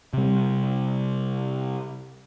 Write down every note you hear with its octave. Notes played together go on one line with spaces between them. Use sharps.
C3 G3